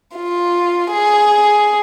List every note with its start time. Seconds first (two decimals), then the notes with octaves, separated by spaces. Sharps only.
0.16 F4
0.93 G#4